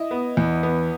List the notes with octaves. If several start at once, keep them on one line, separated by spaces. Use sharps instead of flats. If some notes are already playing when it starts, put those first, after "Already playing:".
Already playing: E4 D#5
B3
E2
B3